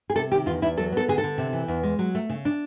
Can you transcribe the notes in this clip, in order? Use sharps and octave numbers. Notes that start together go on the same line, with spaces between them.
G#4
C3 A4
D#3 G4
E2 F4
E2 E4
F#3 A4
B3 A4
D3 G#4
A4
D3
C3
E3
E2
G#3
F#3
A3
C#3
D4